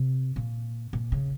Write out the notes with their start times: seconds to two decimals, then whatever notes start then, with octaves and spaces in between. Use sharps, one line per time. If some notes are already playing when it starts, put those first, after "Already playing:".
Already playing: C3
0.36 A#2
0.93 A#2
1.12 C#3